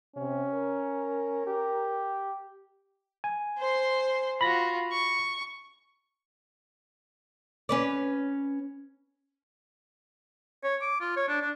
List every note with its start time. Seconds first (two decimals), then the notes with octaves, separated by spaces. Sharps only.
0.16 C3 C#4
0.53 A#4
1.47 G4
3.24 G#5
3.58 C5 C6
4.41 F4 F#4 B5 A#6
4.92 C#6
7.69 C#4 B4 D5
10.64 C#5
10.81 D6
11.01 F4
11.17 C#5
11.28 D4
11.42 D4